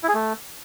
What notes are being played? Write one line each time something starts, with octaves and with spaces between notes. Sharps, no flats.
E4
G#4
A3